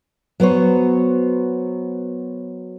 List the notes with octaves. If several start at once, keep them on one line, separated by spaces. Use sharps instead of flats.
F#3 B3 C5 C#5